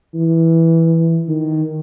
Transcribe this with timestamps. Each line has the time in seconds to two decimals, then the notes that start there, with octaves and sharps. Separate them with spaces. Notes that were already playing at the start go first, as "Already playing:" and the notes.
0.15 E3
1.29 D#3